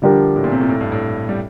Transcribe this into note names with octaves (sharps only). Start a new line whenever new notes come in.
D3 F3 G3 D4 G4 A#4
A2
A#2
C3
A#2
A2
G2
A2
G3